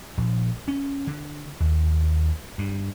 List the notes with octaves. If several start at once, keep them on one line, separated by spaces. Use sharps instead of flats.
A#1
C#4
D3
D#2
G2